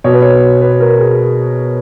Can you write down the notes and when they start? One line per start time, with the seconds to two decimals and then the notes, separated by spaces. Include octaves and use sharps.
0.04 B2 C#5
0.13 B4
0.22 C#5
0.61 B4
0.80 A#4
0.99 G#4